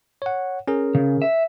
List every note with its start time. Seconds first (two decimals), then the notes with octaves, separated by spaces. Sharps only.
0.22 C#5 F#5
0.68 C#4 G#4 A#4
0.95 C#3
1.22 E5